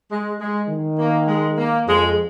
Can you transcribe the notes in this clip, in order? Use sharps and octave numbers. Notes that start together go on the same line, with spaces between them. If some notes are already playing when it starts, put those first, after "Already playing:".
G#3
G#3
D#3
A#3
G#3
A#3
F2 G#3